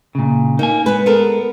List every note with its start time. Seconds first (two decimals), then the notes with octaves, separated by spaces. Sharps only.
0.15 A#2 C#3
0.59 A#3 D#4 G#5
0.86 G#3 B3 B4
1.06 G#3 B3 A4 A#4